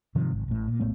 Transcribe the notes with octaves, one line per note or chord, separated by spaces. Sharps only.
G#2 C3 D#3 F3
G#1
A1 A2
A#2
A#1 A2 A3 B3